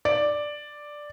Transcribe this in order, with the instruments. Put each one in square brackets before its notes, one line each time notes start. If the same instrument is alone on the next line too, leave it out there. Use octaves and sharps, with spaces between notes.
[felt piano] D5